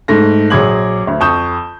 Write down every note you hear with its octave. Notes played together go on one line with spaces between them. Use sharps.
G#2 A3 A#6
A#1 F#3 G#4 D6 G#6 F#7
D2
F2 C#6 D#6 G6 E7